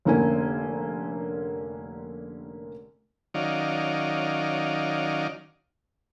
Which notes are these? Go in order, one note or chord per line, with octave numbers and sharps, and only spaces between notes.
F1 D3 A#3 C#4 G#5
D#3 F#3 C#4 D#4 D5 F5